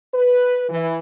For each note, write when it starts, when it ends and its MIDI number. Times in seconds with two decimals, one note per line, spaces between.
0.14 0.64 71
0.70 0.97 52